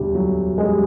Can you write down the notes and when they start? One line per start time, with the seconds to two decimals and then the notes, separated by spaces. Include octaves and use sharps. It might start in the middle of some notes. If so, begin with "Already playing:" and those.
Already playing: E1 D2 G3 A3
0.15 F#3
0.58 G#3
0.65 G3